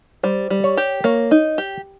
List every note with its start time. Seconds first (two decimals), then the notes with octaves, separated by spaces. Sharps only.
0.23 G3 C5
0.50 G3
0.64 C#5
0.77 G4
1.04 A#3 C#5
1.31 D#4
1.58 G4